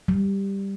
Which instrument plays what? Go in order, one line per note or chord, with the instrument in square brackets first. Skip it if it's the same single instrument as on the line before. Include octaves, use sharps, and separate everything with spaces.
[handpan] G3